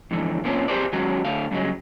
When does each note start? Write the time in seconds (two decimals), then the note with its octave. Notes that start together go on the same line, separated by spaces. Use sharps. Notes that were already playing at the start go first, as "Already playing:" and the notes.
0.11 F2 G#2 D3 E3
0.44 A#2 A#3 C4 C#4 D#4 F4
0.68 C4 G4 G#4 A#4 C5 D5
0.93 D#3 F#3 G#3 C#4 F#4
1.25 D2 D3 F5
1.51 G2 C#3 F3 F#3 G#3